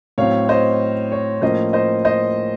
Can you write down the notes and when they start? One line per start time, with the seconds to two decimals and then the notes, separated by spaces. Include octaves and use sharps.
0.18 A2 F#3 C4 C#5 F5
0.49 C5 D#5
1.12 C#5
1.42 A2 F3 A#3 C#4 C5 D#5
1.73 C5 D#5
2.05 C5 D#5